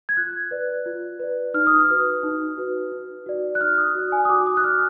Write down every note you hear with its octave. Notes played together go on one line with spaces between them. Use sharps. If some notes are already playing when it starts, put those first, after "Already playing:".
G#6
F4 F#6
B4 D5
F4
B4 D5
D#4 F6
D#6
F6
F#4 B4
D#4
F#4 B4
D#4
F#4 D5
F#6
D#4 F6
D#6
F#4 D5
G#5
D#6
F#4 D6
D#6
F#6
D5 F6